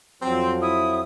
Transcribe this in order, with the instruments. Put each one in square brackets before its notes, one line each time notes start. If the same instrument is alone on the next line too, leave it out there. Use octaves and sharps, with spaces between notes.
[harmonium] F2 F3 F#3 [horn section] C4
[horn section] E4 [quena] D#6